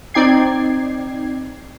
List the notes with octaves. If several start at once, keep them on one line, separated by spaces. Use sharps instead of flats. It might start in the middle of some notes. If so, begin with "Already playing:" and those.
C4 D#4 D5 G5 G#6 C7